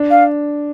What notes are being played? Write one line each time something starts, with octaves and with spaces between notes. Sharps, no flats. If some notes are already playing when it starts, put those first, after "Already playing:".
Already playing: D4
F5